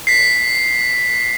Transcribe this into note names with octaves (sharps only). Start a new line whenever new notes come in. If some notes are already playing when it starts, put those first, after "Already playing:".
B6 C7